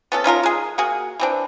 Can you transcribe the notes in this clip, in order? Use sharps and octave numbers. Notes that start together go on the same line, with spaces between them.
B3 C#4 A4
C#4 D#4 F4 A#4
G#3 G#4
A#3 F#4 G#4
E3 C4 D4